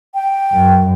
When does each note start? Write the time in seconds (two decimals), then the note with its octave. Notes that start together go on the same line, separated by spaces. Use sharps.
0.14 G5
0.53 F#2